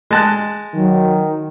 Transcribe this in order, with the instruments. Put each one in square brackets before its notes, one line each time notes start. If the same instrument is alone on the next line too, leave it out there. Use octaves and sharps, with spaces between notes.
[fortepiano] G#3 A5 F#6
[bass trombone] D#3 [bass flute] F#3